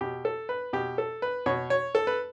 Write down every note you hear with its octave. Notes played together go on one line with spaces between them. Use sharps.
B2 G4
A4
B4
B2 G4
A4
B4
B2 C#5
C#5
A4
B4